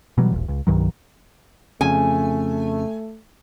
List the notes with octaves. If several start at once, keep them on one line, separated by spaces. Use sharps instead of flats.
B2 E3 F#3 G3
E1 A#1
C#2
C2 G2 D#3 F#3
F2 C#3 A3 G#5